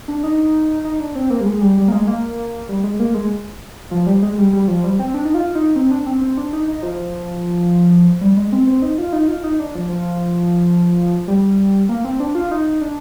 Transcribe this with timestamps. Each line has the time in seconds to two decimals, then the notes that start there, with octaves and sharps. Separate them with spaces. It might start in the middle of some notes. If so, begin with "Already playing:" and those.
0.08 D4
0.23 D#4
0.85 D#4
1.00 D4
1.15 C4
1.30 A#3
1.41 G3
1.46 G#3
1.61 G3
1.77 G3
1.88 A#3
1.92 G#3
2.07 A#3
2.69 G3
2.84 G#3
2.99 A#3
3.14 G#3
3.91 F3
4.06 G3
4.22 G#3
4.38 G3
4.53 G3
4.68 F3
4.84 G3
4.99 C4
5.14 D4
5.25 D#4
5.34 F4
5.55 D#4
5.76 C4
5.91 D4
6.06 C4
6.21 C4
6.37 D4
6.53 D#4
6.68 D#4
6.83 F3
8.21 G3
8.37 G#3
8.52 C4
8.67 C4
8.82 D#4
8.98 F4
9.13 D#4
9.28 F4
9.43 D#4
9.59 D4
9.75 F3
9.90 F3
11.28 G3
11.89 A#3
12.05 C4
12.20 D4
12.35 F4
12.51 D#4
12.81 D4